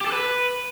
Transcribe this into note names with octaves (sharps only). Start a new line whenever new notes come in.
G4
A4
B4